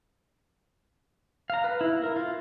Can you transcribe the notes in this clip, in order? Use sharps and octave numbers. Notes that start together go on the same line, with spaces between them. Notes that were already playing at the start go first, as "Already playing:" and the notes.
F5 A#5
B4
E4
A#4
F4 F5